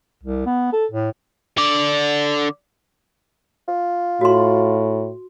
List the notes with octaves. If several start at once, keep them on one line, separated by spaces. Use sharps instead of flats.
C2
B3
A4
A2
D3 D5
F4
A2 F#4 C6